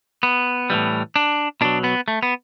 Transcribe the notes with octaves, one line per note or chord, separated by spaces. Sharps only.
B3
A2 E3 G3
D4
B2 F#3 D4
B3
A3
B3